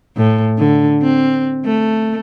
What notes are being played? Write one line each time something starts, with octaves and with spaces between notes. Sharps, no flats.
A2
D3
C4
A3